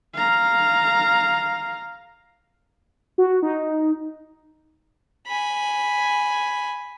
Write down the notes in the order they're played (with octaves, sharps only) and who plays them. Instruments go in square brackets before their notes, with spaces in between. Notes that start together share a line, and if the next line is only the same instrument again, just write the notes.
[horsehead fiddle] F5 A#5
[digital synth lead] F#4
D#4
[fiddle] G#5 B5